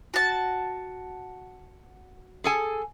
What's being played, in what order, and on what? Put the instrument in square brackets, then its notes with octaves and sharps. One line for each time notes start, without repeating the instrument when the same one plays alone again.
[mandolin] F#4 A5
[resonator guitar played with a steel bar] G#4 A4 G#5